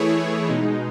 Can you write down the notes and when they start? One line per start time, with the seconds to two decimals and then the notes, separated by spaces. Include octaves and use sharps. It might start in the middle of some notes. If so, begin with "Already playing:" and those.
Already playing: E3 A3 E4 G#4 C#5
0.47 B2 G#3 D#4